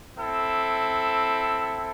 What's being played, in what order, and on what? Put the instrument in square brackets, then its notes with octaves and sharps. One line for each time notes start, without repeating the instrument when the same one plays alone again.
[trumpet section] C4 E4 A4